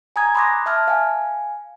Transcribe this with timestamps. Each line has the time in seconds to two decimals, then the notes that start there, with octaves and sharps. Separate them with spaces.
0.16 G#5 A#5 D#6 G#6
0.35 B5 C6 D6 D#6 F#6 A#6
0.66 E5 A5 F6 G#6
0.88 F5 G#5